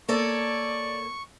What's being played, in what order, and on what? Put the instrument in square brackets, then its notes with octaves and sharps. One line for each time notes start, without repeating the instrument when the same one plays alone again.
[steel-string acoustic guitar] A#3 A4 C#5 [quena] D5 [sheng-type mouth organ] C#6